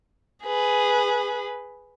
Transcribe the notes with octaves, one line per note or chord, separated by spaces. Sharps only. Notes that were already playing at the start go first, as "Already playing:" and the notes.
G#4 B4